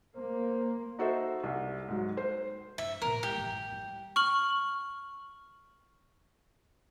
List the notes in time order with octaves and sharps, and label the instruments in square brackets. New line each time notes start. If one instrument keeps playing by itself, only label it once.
[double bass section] A#3 [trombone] C5
[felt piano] D#4 F#4 A4 C5 E5
C2
G#2 F#3
C5
[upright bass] G2 [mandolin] E5
[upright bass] A#2 B3 [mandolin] A#4
[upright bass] G#3 E4 [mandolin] G4
[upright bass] A1 F#2
G3
[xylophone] C#6 F6 F#7